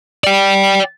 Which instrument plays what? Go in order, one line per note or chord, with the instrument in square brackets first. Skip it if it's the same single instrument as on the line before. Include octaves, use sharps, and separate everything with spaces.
[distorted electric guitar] D5 G5